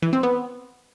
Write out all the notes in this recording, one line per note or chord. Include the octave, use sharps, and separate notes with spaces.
E3
C4
B3